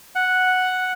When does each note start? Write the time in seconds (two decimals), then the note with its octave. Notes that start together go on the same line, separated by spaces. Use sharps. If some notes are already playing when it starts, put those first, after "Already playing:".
0.15 F#5